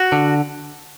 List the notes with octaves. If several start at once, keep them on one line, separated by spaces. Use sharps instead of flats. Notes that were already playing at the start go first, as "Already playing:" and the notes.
Already playing: F#4
D3